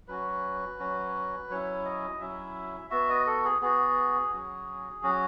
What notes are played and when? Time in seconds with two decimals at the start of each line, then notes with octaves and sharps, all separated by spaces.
0.08 F#3 C#4 F#4 B4
0.79 F#3 C#4 F#4
1.49 F#3 C#4 E4 C#5
1.85 D#5
2.20 F#3 C#4 E4 E5
2.91 B3 F#4 E5
3.09 D#5
3.26 A4
3.45 G#4
3.62 B3 F#4 G#4
4.33 F#3 C#4 F#4
5.03 F#3 C#4 F#4